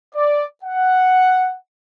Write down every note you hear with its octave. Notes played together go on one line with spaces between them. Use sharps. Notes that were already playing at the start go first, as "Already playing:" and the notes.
D5
F#5